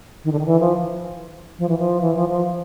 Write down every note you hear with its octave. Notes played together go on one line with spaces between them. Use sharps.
D#3
D3
D#3
E3
F3
F3
E3
F3
E3
F3
F3